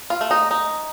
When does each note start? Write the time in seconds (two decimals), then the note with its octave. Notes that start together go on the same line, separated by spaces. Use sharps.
0.10 F4
0.21 A3
0.31 D#4
0.51 D#4